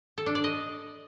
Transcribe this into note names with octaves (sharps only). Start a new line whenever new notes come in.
A4
D4
D5
D#5